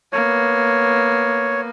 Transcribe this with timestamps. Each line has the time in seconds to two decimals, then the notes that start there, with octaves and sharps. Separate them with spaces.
0.13 A#3 B3 C#5